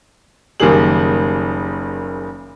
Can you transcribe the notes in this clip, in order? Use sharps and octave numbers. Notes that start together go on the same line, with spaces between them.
F#1 D#3 G3 A#3 G#4 F#7